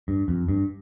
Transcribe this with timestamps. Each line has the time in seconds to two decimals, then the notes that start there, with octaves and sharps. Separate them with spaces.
0.08 G2
0.28 F2
0.48 G2